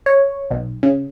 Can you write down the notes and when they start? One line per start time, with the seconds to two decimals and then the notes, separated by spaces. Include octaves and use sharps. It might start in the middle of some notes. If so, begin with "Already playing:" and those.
0.06 C#5
0.51 B1
0.83 C#3